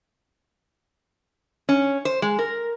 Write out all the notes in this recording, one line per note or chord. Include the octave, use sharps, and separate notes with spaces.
C#4
C5
G#3
A#4